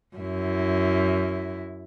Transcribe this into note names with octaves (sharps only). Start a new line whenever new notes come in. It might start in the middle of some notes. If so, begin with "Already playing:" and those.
F#2 E4